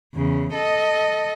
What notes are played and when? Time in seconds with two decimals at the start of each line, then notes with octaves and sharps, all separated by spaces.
0.15 E2 C#3
0.53 A4 D#5